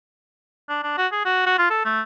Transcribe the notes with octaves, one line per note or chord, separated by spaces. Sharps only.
D4
D4
F#4
G#4
F#4
F#4
F4
A4
A3